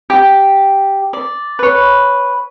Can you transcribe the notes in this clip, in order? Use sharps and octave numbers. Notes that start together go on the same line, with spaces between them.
G4
D5
B4 C#5